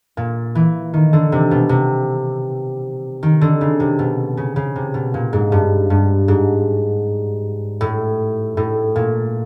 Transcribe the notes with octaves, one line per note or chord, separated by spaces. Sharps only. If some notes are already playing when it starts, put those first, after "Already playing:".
A#2
E3
D#3
D3
C3
B2
C3
D#3
D3
C#3
C3
B2
C#3
C#3
C3
B2
A#2
G#2
G2
G2
G#2
A2
A2
A#2